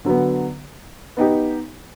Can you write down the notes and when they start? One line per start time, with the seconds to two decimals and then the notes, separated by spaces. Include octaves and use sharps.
0.05 D3 F#3 B3
1.17 B3 D#4 G4